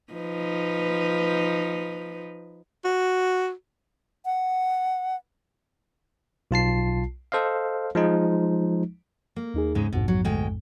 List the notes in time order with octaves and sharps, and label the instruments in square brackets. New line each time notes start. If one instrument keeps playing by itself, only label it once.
[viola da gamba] F3 D#4 B4
[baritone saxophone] F#4
[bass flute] F#5
[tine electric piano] B1 F4 A5 C7
A4 C5 D#5 F5
F3 G#3 D#4
[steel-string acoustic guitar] A#3
[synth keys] D#2 D#4 G#4
[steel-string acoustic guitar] G#2 C#3 G#3
[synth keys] A#1 F2 G#2 [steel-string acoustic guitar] B2
[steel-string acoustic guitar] F#3
D2 G#3 G5